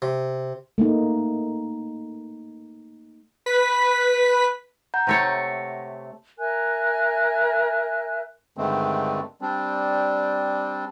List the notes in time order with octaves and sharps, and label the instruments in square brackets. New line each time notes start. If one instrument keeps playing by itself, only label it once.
[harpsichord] C3
[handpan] A3 A#3 D#4
[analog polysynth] B4 B6
[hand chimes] F#5 A#5 G6
[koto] C3 A3 C#5 [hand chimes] F#5 A#6 C#7
[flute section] A#4 E5 G#5 F#6
[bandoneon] G2 D3 D#3 G#3 A3 C4
G3 C4 D4